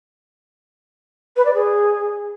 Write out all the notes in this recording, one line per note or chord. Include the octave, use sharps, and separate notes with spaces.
B4
D5
G#4